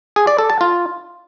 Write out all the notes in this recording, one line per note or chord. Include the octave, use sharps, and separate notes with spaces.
G#4
D5
A4
A5
F4